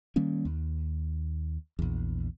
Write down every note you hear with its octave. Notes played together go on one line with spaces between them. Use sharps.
D#3 G3 A#3 C#4
D#2
A#1 E2